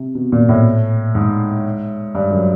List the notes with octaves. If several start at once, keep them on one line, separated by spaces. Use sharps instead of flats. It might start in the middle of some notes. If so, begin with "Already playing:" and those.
Already playing: C3
B2
A#2
A2
G#2
G2
F#2